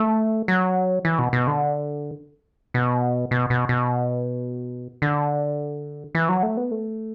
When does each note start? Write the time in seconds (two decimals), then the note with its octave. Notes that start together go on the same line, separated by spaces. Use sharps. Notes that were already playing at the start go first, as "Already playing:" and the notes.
Already playing: A3
0.48 F#3
1.05 E3
1.19 B2
1.33 B2
1.47 D3
2.74 B2
3.31 B2
3.50 B2
3.69 B2
5.02 D3
6.15 E3
6.29 F#3
6.43 A3
6.57 B3
6.71 A3